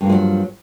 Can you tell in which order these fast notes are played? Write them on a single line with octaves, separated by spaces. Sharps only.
G2 A#3 F3 G#3 F#3